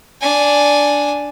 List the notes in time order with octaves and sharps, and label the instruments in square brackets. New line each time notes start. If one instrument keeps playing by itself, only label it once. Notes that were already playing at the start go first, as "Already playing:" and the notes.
[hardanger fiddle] D4 G#5